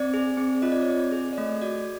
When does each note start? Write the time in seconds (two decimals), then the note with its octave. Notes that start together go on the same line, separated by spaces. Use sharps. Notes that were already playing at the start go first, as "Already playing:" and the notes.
Already playing: C4 D5
0.14 G#4
0.37 C4
0.62 F4 D#5
0.72 D5
0.81 C#5
0.88 C4 D5
0.99 D5
1.12 G#4
1.33 D5
1.37 A3 D#5
1.62 F#4 D5